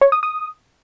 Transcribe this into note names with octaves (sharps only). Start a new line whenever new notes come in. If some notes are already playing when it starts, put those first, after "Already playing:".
C#5
D#6
D#6